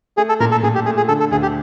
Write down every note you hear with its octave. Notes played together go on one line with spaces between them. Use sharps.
A3 G#4
A4
A#2 A#4
A4
A#2 G#4
G4
A3 G#4
G#4
D3 A4
A4
D2 G#4
G4